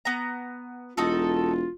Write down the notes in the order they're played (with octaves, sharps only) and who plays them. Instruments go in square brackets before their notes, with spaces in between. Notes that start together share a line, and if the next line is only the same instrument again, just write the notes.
[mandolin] B3 A#5
[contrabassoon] E1 [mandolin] D#4 F#4 A4 [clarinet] F4